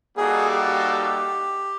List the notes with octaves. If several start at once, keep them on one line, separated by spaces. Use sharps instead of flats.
G3 A#3 D#4 F#4 G#4 A4
G4